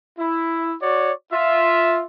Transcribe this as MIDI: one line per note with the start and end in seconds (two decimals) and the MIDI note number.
0.18 0.75 64
0.82 1.12 66
0.82 1.12 73
0.82 1.12 74
1.32 2.03 65
1.32 2.03 76